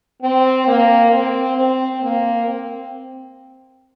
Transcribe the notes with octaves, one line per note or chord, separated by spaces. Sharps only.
C4
A#3
C4
C4
A#3
C4